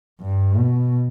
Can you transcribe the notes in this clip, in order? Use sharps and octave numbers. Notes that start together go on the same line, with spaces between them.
G2
B2